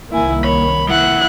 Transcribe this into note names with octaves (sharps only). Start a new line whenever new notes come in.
C2 D#3 A#3 E4 G#5
C#5 B5
F3 E4 F#5 F#6